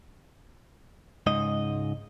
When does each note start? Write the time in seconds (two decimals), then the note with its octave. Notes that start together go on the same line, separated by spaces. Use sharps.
1.27 C#2 G#2 D#5